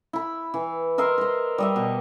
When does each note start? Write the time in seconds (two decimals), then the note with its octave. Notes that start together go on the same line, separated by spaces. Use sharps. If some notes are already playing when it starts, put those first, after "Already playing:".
0.13 E4 B5
0.54 E3
0.98 A#4 D#5 E5 C6
1.18 A#4 C5
1.58 G3 D#5 E5
1.76 B2